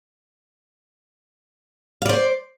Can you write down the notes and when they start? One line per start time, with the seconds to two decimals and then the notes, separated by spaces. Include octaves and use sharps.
2.02 F5
2.06 D5
2.09 C5